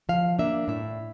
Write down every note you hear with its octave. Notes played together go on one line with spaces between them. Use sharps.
F3 F5
A#3 D4 E5
A2 E5